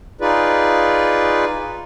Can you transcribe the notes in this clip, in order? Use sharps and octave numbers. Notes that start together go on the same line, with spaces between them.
D#4 F4 G#4 B4 D5